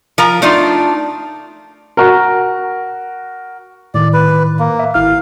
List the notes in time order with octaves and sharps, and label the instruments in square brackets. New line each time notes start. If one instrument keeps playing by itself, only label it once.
[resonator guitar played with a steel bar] F3 A#4 A#5
A3 D4 D#4 F4
[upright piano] F#4 A#4
[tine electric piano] A2 D#3 [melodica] D5
[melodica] B4
A#3
[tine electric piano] E5
[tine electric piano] G#1 E4 F6 [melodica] F5